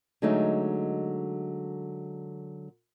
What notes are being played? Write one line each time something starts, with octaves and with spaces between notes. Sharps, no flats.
D3 F#3 G#3 A3 D#4